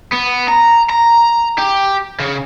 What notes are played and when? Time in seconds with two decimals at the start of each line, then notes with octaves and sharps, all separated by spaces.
0.13 B3
0.49 A#5
0.90 A#5
1.59 G4
2.20 C#3